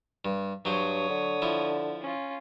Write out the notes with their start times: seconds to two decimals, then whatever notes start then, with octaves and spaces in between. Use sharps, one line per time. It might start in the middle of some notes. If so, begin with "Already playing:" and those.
0.25 G2
0.65 G2 F#3 C5 C#5 D#6
1.09 D3
1.42 F3 E4
2.01 C#4 F4